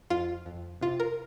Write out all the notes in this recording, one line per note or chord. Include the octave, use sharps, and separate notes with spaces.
F2 F4
F2
C3 F4
A#4